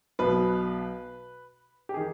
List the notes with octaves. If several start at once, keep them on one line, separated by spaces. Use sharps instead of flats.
B1 B2 B4
G4
D#3 G#4